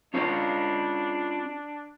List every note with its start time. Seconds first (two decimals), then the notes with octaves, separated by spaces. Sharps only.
0.14 C#4 D4 F4 C#5